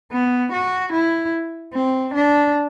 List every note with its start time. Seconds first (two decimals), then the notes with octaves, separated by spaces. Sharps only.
0.12 B3
0.53 F#4
0.93 E4
1.74 C4
2.14 D4